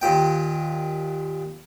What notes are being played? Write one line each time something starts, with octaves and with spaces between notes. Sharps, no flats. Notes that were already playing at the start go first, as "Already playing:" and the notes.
D#2 A#2 G5